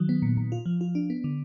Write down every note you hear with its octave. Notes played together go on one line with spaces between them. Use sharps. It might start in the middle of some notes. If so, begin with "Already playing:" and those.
Already playing: D#3 F#3
B3
A#2
A#2
F4
F3
F4
D4
B3
D3